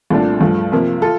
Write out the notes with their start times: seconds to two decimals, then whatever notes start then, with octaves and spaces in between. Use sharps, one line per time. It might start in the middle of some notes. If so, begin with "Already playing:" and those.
0.10 C2 A#2 A3 D4
0.41 G2 F3 A3
0.72 C3 F3 A#3
1.02 F4 A4